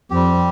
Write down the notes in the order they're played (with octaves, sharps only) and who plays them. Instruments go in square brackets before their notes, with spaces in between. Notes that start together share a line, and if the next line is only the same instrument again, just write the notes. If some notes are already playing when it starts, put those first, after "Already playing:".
[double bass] F2 [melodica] G3 C4 G4